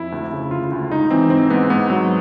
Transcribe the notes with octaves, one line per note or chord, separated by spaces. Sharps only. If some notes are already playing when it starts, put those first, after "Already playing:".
Already playing: F2 E4
D2
C#3
D2 F4
D2
G#2 D#4
E3 C4
G#2 C4
G#2 B3
G#2 B3
F#3